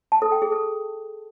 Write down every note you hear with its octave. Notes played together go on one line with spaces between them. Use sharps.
A5
A4
G5
G#4
A4